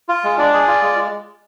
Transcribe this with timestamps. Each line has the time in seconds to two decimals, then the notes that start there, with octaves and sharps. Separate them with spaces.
0.09 F4
0.24 G#3
0.38 D4 D5
0.53 G#4
0.68 F4
0.82 G#3